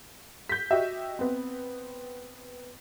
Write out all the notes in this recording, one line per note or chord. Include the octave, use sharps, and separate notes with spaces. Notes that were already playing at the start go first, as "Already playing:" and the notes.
G6 B6
F#4 G4 D#5 E5
B3 C4